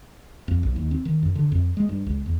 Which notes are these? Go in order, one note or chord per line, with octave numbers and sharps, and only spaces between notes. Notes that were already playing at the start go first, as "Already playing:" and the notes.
F2
B1
D#2
C4
D#3
F#2
D3
F2
G#3
G2
C#2
E2